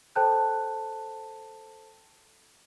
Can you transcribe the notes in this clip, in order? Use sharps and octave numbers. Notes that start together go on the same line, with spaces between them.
A4 C5 G5 A5 F#6 G6